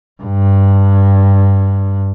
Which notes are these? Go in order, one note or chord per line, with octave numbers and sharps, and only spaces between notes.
G2